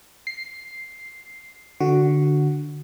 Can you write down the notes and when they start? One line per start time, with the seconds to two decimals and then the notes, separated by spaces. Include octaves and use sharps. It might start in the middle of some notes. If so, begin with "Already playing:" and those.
0.27 C7
1.80 D3 F#4